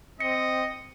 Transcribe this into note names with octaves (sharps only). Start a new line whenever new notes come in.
C4 D#5 C#7